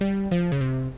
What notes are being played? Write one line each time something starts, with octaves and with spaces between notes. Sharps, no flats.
G3
F3
C#3
C3